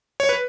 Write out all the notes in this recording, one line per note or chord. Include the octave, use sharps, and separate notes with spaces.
C#5
B4